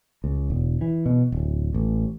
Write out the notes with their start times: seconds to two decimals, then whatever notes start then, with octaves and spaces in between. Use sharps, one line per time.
0.24 C#2
0.50 E1
0.81 E3
1.06 B2
1.32 D1
1.74 A1